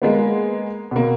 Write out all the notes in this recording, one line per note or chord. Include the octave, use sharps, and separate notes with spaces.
G#3 A#3 B3
B2 A#3